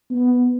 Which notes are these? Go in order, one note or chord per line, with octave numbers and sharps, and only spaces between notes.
B3